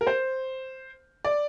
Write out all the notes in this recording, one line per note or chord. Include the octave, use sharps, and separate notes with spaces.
A#4
C5
D5